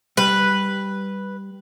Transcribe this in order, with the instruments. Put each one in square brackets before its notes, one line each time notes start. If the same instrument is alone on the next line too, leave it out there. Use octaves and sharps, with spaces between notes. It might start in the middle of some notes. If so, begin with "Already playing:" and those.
[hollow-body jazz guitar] G3 [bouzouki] B4